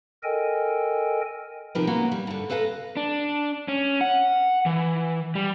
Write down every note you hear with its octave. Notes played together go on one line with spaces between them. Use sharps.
A4 A#4 D#5 G5 G#5
C3 D#3 F3 G4 A#4 B4
F#3 A#3 B3 C#4 F#4
G3
G2 D3
A4 B4 F5 G5 A#5
D4
C#4
F#5
E3
G3